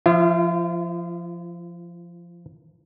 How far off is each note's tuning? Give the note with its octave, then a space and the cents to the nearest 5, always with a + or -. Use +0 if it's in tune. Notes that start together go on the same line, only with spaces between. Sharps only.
F3 -10 F4 -40 E5 +0